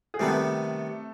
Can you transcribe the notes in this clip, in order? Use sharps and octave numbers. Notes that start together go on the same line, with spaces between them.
G#4
C3 D#3 G3 A3 B3 A4